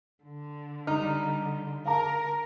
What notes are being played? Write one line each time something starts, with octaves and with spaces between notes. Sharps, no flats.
D3
G3 D#4 F6
A#4 F5 A5 A#5